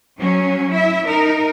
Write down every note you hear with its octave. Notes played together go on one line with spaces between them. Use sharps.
F#3 C#4
E4 E5
D#4 A#4